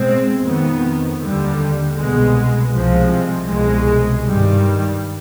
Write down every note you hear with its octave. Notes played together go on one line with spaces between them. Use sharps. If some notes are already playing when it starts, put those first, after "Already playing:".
Already playing: B2 G#3 C4
F2 D#3 B3
D#2 D3 G3
C2 B2 G#3 B3
C2 C3 F3 G#3
C2 B2 G#3
G2 D#3 G3